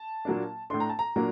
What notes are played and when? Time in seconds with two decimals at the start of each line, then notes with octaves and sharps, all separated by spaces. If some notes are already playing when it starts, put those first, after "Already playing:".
Already playing: A5
0.25 A#2 F#3 A#3 D4
0.70 A2 A3 D4 C6
0.80 A#5
0.89 A5
0.99 A#5
1.16 A#2 F#3 A#3 D4